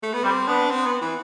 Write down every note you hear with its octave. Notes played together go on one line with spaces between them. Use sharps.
A3
B3
G3 C4
B3 D4
C4
B3
E3